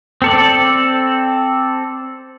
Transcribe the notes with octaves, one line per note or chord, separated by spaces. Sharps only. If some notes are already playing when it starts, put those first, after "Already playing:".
C4 A4 D5